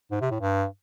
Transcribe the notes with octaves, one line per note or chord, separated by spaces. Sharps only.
G#2
C3
A2
G2